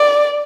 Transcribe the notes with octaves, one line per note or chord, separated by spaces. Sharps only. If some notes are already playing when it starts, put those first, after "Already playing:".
Already playing: D5